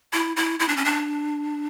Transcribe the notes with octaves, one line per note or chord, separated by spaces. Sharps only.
E4
E4
E4
D4
C#4
D4